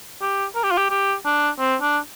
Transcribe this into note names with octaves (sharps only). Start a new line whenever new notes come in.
G4
A#4
G4
F4
G4
G4
D4
C4
D4